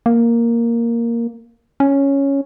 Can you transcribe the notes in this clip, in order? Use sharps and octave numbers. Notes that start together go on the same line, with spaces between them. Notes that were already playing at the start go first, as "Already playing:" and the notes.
A#3
C#4